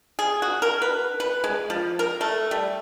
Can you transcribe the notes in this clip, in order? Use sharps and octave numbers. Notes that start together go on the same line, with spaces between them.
G#4
F#4
A#4
B4
B4
G#3
F3
A#4
A3
G3